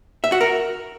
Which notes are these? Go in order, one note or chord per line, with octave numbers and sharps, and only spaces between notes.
E5
F#4
A#4